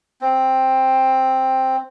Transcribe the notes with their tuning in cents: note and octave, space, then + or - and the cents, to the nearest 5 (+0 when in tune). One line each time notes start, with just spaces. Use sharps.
C4 +5